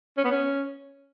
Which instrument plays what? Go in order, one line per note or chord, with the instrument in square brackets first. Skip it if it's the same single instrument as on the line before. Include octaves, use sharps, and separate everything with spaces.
[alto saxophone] C#4
B3
C#4